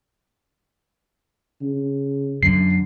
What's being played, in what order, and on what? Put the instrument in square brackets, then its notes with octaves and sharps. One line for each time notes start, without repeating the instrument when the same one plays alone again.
[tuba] C#3
[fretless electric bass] F#2 D3 [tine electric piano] C7